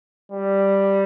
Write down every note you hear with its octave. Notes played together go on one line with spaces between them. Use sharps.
G3